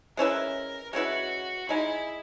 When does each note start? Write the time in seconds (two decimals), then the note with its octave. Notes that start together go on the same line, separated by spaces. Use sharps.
0.17 G#3 C#4 E4 A#4 B4
0.93 G#3 C#4 E4 F#4 B4
1.69 G#3 D#4 E4 G#4